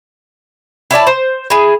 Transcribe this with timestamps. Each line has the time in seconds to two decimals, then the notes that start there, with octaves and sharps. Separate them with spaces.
0.91 E4 C#5 D5 A5
1.07 C5
1.50 E4 G#4